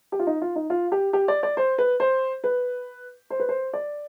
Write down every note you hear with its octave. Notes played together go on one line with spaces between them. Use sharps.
G4
F4
D#4
F4
D#4
F4
G4
G4
D5
D5
C5
B4
C5
B4
C5
B4
C5
D5